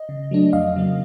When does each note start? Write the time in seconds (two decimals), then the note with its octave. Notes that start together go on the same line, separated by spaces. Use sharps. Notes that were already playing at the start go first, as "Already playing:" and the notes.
Already playing: D#5
0.09 C#3
0.31 F#3 A3 D4
0.53 F2 D#5 F5
0.76 C#3 F#3 A#3